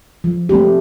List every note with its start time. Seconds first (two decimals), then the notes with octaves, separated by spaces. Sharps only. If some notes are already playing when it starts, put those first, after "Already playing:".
0.24 F3
0.49 A3 C4 G4